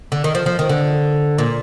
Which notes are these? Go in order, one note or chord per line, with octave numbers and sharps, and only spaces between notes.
D3
D#3
F3
F3
D#3
D3
A#2